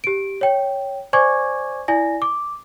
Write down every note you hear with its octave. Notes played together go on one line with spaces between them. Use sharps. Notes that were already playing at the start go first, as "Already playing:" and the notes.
G4 D7
C#5 G5
C5 D5 G#5 C#6 D6 G#6
E4 D5 G#5 A#6
D6